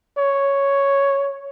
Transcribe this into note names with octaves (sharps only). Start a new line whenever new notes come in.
C#5